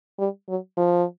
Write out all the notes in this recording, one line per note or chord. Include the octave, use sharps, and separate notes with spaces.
G3
F#3
F3